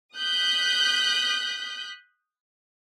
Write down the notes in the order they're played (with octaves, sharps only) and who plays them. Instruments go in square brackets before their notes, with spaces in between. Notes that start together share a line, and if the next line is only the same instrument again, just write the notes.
[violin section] D#6 F#6 G6 B6